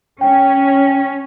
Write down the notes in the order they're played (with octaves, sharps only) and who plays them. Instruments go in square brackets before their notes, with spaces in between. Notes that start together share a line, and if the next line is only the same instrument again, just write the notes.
[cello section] C#4 [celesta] G5